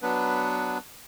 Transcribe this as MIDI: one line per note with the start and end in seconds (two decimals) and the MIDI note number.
0.02 0.78 54
0.02 0.78 59
0.02 0.78 62
0.02 0.78 71